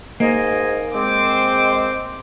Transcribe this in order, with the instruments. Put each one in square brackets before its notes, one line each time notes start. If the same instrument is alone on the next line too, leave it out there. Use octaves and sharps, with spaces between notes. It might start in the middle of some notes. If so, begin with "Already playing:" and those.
[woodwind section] G#2 D#5 G#5 [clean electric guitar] A#3
[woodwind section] G#3 C4 [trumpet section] C5 D6